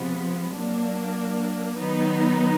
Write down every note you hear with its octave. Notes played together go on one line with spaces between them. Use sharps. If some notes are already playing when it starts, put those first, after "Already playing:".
Already playing: C3 F3 G#3 B3
F#3 A#3 D4
D#3 F#3 B3 D#4